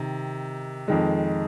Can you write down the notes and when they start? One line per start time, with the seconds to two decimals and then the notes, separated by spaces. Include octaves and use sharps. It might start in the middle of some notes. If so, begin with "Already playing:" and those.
Already playing: C3 D#3
0.88 F2 D#3 G#3